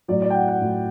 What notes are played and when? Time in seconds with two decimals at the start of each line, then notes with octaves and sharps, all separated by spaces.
0.08 A2 F#3 D5
0.22 D5
0.30 G5
0.34 F#5
0.48 F#5
0.61 A2 F#3